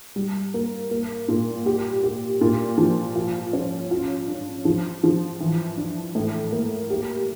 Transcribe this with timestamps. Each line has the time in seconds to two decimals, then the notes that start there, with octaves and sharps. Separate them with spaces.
0.16 G3
0.54 A#3
0.91 A#3
1.28 A#2
1.66 G4
2.04 G4
2.41 A#2
2.78 F3
3.16 F4
3.53 C#4
3.91 F4
4.28 D4
4.65 F3
5.04 F3
5.40 E3
5.78 D4
6.15 A2
6.52 A#3
6.90 G4